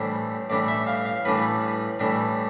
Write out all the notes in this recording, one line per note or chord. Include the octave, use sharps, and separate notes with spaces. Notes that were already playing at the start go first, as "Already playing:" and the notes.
Already playing: A2 E3 G3 D4 C5
A2 E3 G3 D4 D5
E5
F5
F5
A2 E3 G3 D4 B4
A2 E3 G3 D4